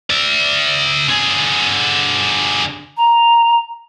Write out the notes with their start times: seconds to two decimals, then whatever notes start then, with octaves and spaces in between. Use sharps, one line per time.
0.10 D5 E5
1.09 D3 G#4
2.97 A#5